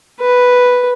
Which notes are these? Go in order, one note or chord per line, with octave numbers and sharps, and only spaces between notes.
B4